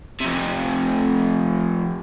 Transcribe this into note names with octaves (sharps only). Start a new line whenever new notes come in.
F2 C3